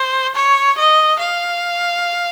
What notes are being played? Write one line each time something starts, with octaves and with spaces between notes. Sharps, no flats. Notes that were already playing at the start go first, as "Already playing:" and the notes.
Already playing: C5
C#5
D#5
F5